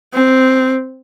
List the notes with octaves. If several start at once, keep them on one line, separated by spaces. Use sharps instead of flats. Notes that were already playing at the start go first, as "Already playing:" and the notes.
C4